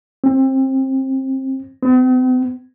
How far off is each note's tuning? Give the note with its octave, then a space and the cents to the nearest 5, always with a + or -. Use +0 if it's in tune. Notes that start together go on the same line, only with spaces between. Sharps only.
C4 +25
C4 -45